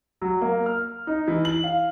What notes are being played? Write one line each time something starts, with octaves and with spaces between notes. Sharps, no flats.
F#3
A#3
F6
D#4
E3
F#7
F5